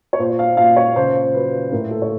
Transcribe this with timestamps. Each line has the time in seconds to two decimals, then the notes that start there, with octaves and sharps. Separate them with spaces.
0.13 C#5
0.19 A#2 C5
0.39 F5
0.57 A#2 F5
0.76 C#5
0.96 C#3 C5
1.34 F#3 B4
1.72 A2 A#4
1.91 A4
2.02 C#5